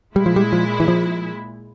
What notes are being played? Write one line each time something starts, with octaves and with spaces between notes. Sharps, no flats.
A#2 G3 G#3 E4
F3
G3
F3
E3
F3